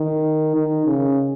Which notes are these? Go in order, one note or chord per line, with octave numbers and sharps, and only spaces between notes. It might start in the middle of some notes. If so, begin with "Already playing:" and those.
Already playing: D#3
D#3
C#3